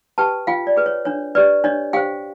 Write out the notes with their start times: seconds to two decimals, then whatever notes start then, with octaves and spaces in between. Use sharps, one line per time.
0.18 G4 B4 G5 A5
0.47 F4 F5 G5
0.67 D5
0.76 G#4 B4
0.86 C#5
1.05 D4 C#5
1.35 G4 B4 D5
1.64 D4 C#5 D#5
1.93 G4 C5 F5 G5